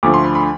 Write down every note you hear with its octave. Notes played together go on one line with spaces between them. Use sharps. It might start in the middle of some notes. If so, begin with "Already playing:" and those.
D2 D3 F3 A3 D6
C6
B5
B5